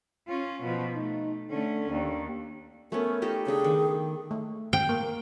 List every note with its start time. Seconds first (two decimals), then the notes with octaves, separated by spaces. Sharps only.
0.28 C#4 F4
0.63 B2 F3
0.95 A3 D#4
1.50 D3 A3 C#4
1.90 D#2 D4
2.92 A3 B3 C#4 A#4
3.22 D#4 G4 A4
3.47 C#3 D4 G#4 G5
3.64 D#3
4.31 A3
4.73 G5
4.89 A#3